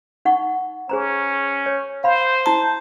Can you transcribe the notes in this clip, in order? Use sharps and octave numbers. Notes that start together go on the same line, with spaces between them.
D#4 F#5 C#6
C#4 G#4 C5 A#5
C#5
C5 F5 B5
E4 A5 A#5